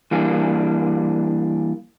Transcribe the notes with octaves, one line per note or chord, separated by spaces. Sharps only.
E3 G3 A#3 D4